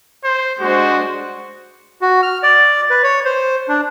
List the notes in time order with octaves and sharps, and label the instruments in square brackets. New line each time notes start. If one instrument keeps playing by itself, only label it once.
[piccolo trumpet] C5
[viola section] G#3 D4 C5 [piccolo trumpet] F#4
[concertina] F#4
F6
D5
B4
C#5
C5
D4